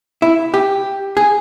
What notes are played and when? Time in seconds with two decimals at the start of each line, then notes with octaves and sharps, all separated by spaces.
0.22 E4
0.54 G4
1.17 G#4